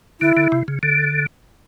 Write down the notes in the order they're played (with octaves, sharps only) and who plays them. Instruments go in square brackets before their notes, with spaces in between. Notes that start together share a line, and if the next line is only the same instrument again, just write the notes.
[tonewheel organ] D3 [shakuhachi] E4
[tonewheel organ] D3
C3
C#3
D3